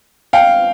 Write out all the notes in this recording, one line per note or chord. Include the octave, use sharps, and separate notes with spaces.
F5 G5